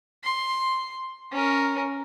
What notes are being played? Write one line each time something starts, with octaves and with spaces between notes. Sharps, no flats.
C6
C#4 A#4